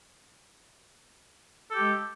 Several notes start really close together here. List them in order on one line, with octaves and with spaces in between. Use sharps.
A4 G4 G#3